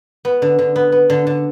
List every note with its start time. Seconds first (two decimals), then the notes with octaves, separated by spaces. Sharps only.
0.25 B3
0.42 D3
0.59 D3
0.76 B3
0.92 B3
1.10 D3
1.27 D3